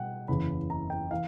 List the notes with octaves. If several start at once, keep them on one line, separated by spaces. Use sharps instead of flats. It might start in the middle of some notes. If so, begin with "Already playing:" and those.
Already playing: B2 G3 F#5 G5
F#1 E2 C#3 B5
A#5
G5
E3 F5